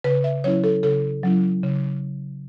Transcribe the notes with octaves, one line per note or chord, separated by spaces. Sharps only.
C#3 B4
E5
F#3 C#4 E4 C#5
A4
C#3 A4
F#3 C#4 E4
C#3